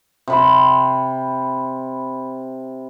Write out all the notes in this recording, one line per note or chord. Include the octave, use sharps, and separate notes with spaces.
C3 B5 C6